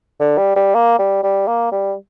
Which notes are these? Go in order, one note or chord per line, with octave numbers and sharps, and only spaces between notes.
D3
G3
G3
A#3
G3
G3
A#3
G3